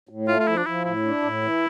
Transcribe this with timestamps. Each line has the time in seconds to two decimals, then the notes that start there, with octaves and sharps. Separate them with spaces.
0.09 A2
0.28 A3 F4
0.40 F4
0.47 F3 E4
0.57 D4
0.66 F3 E4
0.85 A2 E4
1.04 D4
1.23 A2
1.42 E3